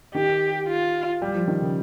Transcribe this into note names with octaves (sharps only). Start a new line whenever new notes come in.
D#3 G4
F4
G3
F3
D#3
C#3